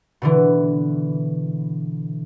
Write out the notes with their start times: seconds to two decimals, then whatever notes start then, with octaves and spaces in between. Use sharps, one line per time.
0.22 B2 D3 E3